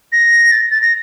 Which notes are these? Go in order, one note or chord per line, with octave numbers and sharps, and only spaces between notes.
A#6
A6
A6
A#6